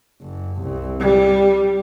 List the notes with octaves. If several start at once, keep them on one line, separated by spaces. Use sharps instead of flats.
F#1
C2
G3